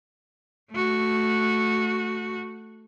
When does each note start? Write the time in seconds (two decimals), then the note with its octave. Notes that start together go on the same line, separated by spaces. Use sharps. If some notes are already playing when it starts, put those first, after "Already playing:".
0.72 A3 F#4